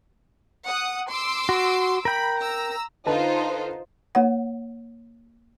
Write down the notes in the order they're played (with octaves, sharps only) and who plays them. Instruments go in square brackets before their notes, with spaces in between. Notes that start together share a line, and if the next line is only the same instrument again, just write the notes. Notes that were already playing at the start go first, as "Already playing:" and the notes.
[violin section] F#5 D#6
C6 D6 E6
[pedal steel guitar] F#4
[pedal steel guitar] A#4 G5 [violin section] B5
[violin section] A#5 E6
[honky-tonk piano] D3 B4 A5 [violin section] D#4 F4 C5
[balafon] A#3 C#5 F#5